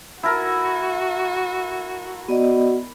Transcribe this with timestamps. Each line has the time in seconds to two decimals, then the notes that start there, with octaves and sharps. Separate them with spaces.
0.23 E4 F#4 A4 A#4
2.28 B3 F#4 D5 D#5